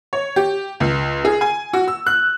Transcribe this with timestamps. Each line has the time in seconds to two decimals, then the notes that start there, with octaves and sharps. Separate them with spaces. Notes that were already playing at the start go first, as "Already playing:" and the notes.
0.13 C#5
0.36 G4
0.80 C#2
1.25 G#4
1.41 G#5
1.73 F#4
1.88 E6
2.06 F#6